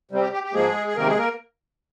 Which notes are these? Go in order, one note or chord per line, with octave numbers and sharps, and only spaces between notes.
C3 G3 C4
G4
G4
G4
G#2 F3 G#3 A#3 G#4
G#4
C3 D#3 G#3 A#3 A#4
G#3 G#4
A#3 A#4